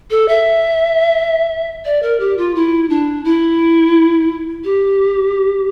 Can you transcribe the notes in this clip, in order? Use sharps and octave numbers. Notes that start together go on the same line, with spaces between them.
A4
E5
D5
A#4
G4
F4
E4
D4
E4
G4